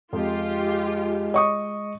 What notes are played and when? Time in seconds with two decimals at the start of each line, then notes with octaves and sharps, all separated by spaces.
0.13 F2 G#3 F4 G4
1.34 D#5 C#6 D#6